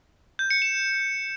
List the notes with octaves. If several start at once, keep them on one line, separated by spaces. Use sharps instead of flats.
G6
C#7
E7